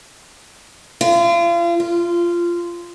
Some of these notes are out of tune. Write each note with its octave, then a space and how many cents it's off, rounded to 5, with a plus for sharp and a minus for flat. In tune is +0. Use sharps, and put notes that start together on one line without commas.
F4 -35
F4 -15